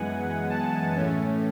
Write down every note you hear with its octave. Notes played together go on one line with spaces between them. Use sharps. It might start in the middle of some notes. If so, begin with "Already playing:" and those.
Already playing: F#2 E3 G#3 B3 F#5 G#5
A5
A2 E3 A3 C#4